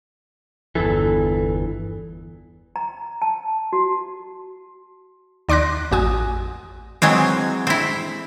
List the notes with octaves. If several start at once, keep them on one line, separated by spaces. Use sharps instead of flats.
G1 E2 E3 A4
A#5
A5
F#4
D#2 D5 C6 D6 F#6 A#6
A1 F2 F#4 G#5 D#6
E3 F#3 G#3 C4
C4 E4